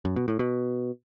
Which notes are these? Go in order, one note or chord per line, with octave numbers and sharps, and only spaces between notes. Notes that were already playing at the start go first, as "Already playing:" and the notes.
F#2
B2
A2
B2